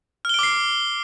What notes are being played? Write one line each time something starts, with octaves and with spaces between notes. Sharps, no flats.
D6 F6 C7 D7 G7